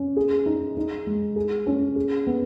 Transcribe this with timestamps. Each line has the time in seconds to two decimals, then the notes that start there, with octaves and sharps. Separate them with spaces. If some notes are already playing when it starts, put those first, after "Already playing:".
Already playing: C#4
0.16 G#4
0.46 D#4
0.77 D#4
1.06 G#3
1.36 G#4
1.66 C#4
1.96 G#4
2.27 B3